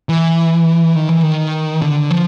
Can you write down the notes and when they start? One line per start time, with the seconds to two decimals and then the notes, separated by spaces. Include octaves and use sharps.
0.09 E3
0.95 D#3
1.09 E3
1.23 D#3
1.82 D3
2.11 F3